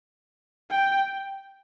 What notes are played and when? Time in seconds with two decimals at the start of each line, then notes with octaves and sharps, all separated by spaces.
0.70 G5